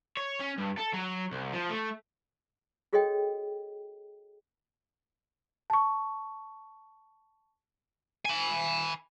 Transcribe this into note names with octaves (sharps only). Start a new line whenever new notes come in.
C#5
C#4
G2
A4
F#3
C2
F3
A3
F#4 G#4 A4 C#5 D#5 G5
A5 C#6
G#5 B5